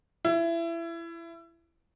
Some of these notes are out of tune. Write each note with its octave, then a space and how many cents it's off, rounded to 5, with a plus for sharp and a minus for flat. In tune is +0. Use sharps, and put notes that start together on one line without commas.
E4 +25